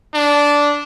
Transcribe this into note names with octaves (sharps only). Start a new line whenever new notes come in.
D4